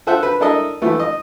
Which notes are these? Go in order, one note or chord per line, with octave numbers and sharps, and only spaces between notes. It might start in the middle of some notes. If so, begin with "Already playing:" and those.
F4 A4 C5 E5 F#5
B4
D4 E4 A4 A#4 D#5
E3 F3 A3 B3
D#5